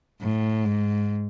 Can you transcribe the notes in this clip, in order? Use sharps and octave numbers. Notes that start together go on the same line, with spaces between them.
A2
G#2